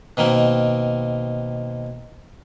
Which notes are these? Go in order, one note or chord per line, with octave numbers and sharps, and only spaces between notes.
B2 D#3 A#3 C4